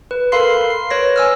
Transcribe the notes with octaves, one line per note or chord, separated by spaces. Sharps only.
B4
A4 A#4 F5 B5 C6 C7
C7
B4 C#5 A#6
G#5 E6 F6